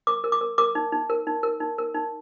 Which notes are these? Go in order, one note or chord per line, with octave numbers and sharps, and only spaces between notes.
A#4 D6
A#4
D6
A#4
A#4 D6
D#4
D#4
A#4
D#4
A#4
D#4
A#4
D#4